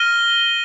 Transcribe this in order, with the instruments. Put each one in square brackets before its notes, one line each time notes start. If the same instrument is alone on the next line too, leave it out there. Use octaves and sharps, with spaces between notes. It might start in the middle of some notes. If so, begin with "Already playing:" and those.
Already playing: [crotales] F6 A#6 D#7 G7